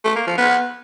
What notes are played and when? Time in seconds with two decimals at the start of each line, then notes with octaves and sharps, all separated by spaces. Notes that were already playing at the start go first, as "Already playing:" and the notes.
0.04 A3
0.16 A#3
0.27 F3
0.38 B3